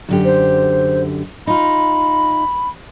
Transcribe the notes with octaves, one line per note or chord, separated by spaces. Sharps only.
F#2 D3 G4
C5
D#4 F4 B5